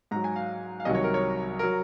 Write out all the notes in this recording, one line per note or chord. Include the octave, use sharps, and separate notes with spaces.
G#2 F#3 A#5
G#5
F5
F5
C2 C3 D#3 F#3 D#5
C#5
A#4
C#5
F#3 A#4